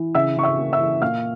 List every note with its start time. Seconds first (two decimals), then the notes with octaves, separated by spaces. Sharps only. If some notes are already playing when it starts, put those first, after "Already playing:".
Already playing: E3
0.15 C#3 E5 E6
0.37 C#3 C#6
0.43 E5 E6
0.58 A#3
0.73 E5 E6
0.80 E3
1.02 A#2 F5 F6